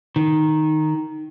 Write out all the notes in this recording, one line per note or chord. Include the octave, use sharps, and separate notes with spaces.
D#3